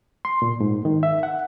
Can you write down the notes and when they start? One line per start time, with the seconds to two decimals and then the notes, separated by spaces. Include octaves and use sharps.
0.25 C6
0.42 A#2
0.60 G#2
0.85 D#3
1.03 E5
1.23 F#5